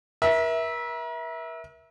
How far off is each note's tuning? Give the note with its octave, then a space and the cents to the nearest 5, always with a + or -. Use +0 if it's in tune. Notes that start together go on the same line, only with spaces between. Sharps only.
A#4 +40 E5 -15